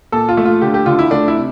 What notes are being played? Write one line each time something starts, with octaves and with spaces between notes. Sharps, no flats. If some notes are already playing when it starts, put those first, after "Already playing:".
A#2 A4
F4
A3
F4
D3 G4
G4
D3 F4
E4
A3 D4
E4
C3